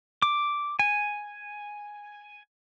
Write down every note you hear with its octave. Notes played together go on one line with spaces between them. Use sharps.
D6
G#5